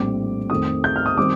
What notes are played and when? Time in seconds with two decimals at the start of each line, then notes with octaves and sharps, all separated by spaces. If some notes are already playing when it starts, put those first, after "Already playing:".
Already playing: A#1 A2 G3 C4 D6
0.50 F2 D#3 A3 C4 D#6
0.84 G6
0.96 F6
1.06 D#6
1.17 D#3 G3 C4 D6